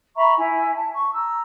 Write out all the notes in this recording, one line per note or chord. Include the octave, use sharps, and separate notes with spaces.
E5 A#5 B5 C#6
E4 G#5
A5
C#6
A#5 E6